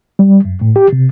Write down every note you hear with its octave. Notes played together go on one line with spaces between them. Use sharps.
G3
F#2
A2
G4
C3